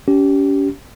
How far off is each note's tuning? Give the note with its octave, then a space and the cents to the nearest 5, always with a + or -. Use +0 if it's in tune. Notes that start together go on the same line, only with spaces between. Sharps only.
C#4 +35 G4 -20